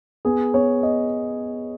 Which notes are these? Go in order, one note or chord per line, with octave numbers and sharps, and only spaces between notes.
B3 G#4
B3 C#5
D#5